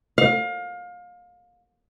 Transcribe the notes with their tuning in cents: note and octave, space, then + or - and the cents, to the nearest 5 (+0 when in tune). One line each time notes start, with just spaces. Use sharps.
F5 +30